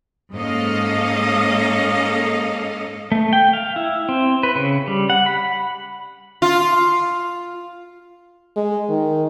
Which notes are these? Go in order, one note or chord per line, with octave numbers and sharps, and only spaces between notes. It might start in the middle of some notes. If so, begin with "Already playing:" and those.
G#2 A#3 C#4 A4 D#5 F5
A3
G5
F5
E4
C4
B4
C#3
G3
F#5
B5
F4
G#3
D#3